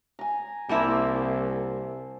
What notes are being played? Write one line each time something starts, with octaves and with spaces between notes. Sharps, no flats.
G#5 A#5
C2 G3 A#3 E4 C5 E5 A5